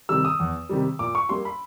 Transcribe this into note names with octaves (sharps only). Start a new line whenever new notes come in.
C3 D#3 G3 E6
D#6
E2
C3 D#3 G3
A#2 D6
C#6
G3 A#3 C6
B5